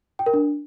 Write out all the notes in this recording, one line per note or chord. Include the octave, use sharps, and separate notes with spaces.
G5
A#4
D4